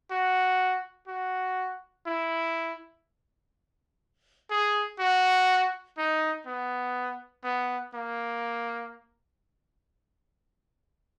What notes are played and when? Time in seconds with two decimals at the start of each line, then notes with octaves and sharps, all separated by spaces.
0.11 F#4
1.08 F#4
2.06 E4
4.50 G#4
4.99 F#4
5.97 D#4
6.46 B3
7.44 B3
7.94 A#3